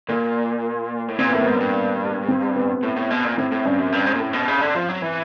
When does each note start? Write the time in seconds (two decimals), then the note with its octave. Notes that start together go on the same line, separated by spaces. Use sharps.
0.09 A#2 A#3
1.08 A2
1.19 A#2 C4
1.26 B3
1.33 A2 A#3
1.41 G#2 B3
1.55 F#2
1.60 G2
2.28 C4
2.56 B3
2.83 A2
2.96 A2
3.10 B2
3.24 A#2
3.38 A2 C4
3.52 A2
3.65 G2 C#4
3.78 F#2
3.92 G2
4.06 G#2
4.14 A#2
4.19 A2
4.33 B2
4.48 C#3
4.61 D3
4.75 F3
4.89 F#3
5.02 E3